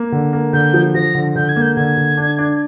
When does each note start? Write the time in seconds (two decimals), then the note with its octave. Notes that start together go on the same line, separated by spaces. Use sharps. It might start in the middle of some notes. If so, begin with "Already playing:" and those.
Already playing: A#3
0.12 D3
0.33 A#3
0.53 D3 G6
0.73 F3
0.94 F3 A#6
1.15 D3
1.35 D3 G6
1.49 G#6
1.56 A#3
1.62 G6
1.76 D3 G#6
1.97 D3
2.17 D4
2.38 D4